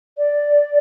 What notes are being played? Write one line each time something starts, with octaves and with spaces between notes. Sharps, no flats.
D5